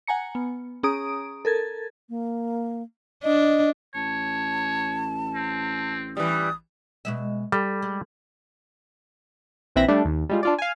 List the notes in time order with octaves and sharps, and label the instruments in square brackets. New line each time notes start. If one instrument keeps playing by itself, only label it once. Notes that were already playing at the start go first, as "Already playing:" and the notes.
[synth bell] F#5 G#5 A#5 C#7
B3
C#4 G#4 A#5 D#6 D7
A4 A#4 G#6 A6
[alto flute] A#3
[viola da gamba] D4 [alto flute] D#5
[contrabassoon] A1 [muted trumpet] C#5 [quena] A5
[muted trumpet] C4
[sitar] E3 G3 [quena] D#6
[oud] B2 G#3 E5
[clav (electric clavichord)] G3 [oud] A4
[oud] G#3
[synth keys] A#1 E3 C4 E5 B5 A#6
G3 A3 D4
D#2
G3 G#3 F4
D4 F4 D5
F5 G#5